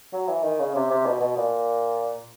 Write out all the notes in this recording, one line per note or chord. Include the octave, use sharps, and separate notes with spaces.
F#3
E3
D#3
C#3
C3
C3
B2
B2
A#2